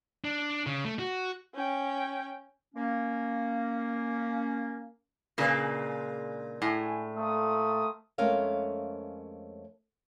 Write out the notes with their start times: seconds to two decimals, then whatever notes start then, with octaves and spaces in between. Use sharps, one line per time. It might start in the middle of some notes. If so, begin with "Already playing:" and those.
0.25 D4
0.66 C#3
0.85 A3
0.99 F#4
1.54 C#4 G5
2.75 A#3 C#4
5.38 A#2 C#3 G#3 A#3 D4 B4
6.62 A2 G#5
7.15 A3 A#3 C4 D#6
8.18 F2 G#3 A3 C#4 A#4 F5